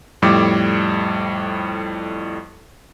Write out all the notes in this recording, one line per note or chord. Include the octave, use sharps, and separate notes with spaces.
F2 A2 G3 D6